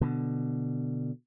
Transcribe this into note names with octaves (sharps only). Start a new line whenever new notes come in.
B2 D3